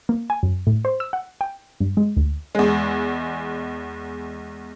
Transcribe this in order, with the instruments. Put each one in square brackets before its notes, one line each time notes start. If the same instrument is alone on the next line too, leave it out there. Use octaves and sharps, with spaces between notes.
[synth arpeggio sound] A#3
G#5
F#2
A2
C5
E6
F#5
G5
G2
G#3
D2
[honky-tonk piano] E2 G#3